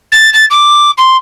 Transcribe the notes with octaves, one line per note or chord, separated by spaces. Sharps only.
A6
A6
D6
C6